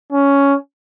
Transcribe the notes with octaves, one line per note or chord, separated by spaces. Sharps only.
C#4